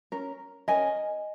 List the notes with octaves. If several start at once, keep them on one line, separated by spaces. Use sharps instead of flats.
C#4 A#4
C#4 A#4 D#5 G#5